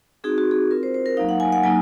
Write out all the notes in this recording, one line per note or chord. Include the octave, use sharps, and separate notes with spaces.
C4 D#4 F#4 G#4
F#4
G#4
C4 F4 A#4
C5
C5
A#4
F#3 A#3 D#4 F5
F#5
G#5
F#5
F#3 A#3 D#4 G#5